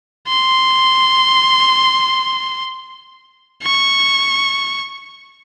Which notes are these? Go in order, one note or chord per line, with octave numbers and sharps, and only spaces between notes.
C6
C#6